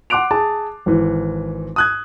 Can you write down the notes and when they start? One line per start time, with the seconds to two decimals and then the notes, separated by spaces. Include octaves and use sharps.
0.10 F#5 C6 D6 F#6 D7 F7
0.31 G#4 A5
0.86 G#1 E3
1.76 D#6 F#6 G#6